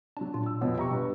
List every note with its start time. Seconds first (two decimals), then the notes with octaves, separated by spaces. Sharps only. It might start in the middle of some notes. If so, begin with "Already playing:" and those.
0.17 F#3 D4 A5
0.34 A#2 F4
0.46 E6
0.61 F2 B2 F3 B3 C#5 E6
0.77 G4 E5 G5 A#5 B5 C#6
0.91 G2 B2 B3